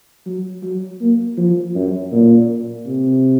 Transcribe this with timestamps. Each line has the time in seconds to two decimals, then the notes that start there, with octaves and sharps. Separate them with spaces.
0.26 F#3
0.63 F#3
1.01 A#3
1.38 F3
1.75 F#2
2.12 A#2
2.87 C3